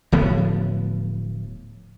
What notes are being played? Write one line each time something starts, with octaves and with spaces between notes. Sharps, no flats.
D1 A2 F3 B3